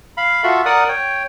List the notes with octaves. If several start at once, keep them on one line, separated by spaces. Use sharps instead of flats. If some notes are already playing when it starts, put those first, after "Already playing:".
F5 B5
F4 F#4 A4 E5
A#4 D5 F#5 D#6 F#6
C#5 G5